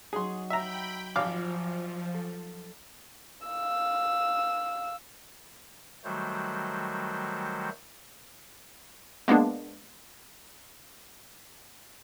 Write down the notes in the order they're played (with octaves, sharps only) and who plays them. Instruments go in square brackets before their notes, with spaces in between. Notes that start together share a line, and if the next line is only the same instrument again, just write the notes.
[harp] F#3 D#4 [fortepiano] G#4 C6
[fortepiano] E5 A#5 [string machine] G5 B5
[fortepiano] G#1 F5 D6 [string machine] F3
[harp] A4
[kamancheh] F5 E6
[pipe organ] D#3 F#3 G3 A3 F#4 C5
[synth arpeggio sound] G#3 A#3 B3 D4